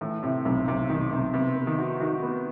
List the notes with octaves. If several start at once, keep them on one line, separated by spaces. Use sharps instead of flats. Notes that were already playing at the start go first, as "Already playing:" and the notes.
A2 E3
A2 C3
B1 C3
B1 C3
B1 D#3
B1 C3
C3 B3
B3
D#3
F#4
D#3 F#4
B3